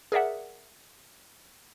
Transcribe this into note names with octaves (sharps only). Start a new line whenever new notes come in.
G#4 A#4 D5 E5 F#5